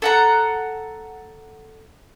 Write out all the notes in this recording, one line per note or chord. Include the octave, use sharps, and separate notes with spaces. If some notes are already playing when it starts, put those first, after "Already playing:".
A4 F#5 A#5